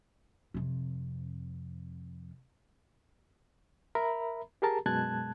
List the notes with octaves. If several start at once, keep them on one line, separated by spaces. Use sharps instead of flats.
F2 C3
A#4 E5 A#5 B5
G4 G#4 A#4 A5 A#5
F#2 B2 G#3 A5 F#6 G#6